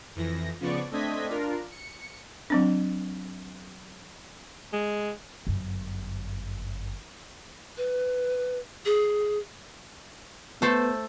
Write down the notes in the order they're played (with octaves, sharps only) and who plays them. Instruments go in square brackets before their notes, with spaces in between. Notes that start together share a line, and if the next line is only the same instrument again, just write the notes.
[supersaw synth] F2 E3 A#6
C#3 F3 B3 D5 C#6
A3 C4 D4 D#5 G#6 B6
D4 F4 A#4
C#7
[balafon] F#3 C4 D4
[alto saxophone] G#3
[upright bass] G1 F#2
[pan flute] B4
G#4
[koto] A3 A4 C5 [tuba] B3